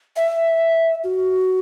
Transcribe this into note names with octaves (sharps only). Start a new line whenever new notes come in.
E5
F#4